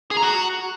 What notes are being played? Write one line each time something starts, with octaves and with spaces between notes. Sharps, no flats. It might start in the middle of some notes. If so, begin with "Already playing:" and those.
G#4
A#5
F#4